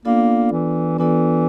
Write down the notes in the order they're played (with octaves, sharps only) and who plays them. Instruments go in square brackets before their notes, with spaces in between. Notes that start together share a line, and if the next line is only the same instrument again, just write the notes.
[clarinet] A#3 [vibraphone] B3 D4 F4 A4 D5
[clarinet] E3
[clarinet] E3 [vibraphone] B3 D4 F4 A4 D5